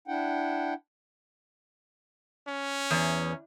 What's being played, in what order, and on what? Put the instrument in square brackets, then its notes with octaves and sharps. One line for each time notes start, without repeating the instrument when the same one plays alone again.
[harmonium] D4 E4 F#5 G5
[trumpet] C#4
[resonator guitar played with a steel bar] E2